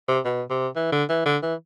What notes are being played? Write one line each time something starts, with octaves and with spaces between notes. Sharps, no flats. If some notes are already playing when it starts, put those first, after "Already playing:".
C3
B2
C3
E3
D3
E3
D3
E3